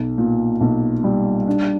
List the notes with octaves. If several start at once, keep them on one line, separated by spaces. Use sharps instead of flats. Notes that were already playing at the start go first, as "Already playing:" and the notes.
Already playing: B1
A#2
B1
G3
D4